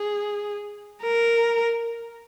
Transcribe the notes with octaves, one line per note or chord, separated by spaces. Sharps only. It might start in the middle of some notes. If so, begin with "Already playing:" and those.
Already playing: G#4
A#4